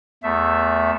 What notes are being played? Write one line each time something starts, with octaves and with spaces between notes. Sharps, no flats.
E2 A3 E5